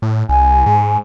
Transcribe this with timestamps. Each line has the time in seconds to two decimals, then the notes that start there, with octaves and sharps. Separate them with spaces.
0.02 A2
0.29 C2 G#5
0.66 G#2